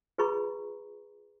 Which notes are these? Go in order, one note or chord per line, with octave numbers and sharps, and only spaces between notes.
F4 G#4 B4 A#5 B5 C#6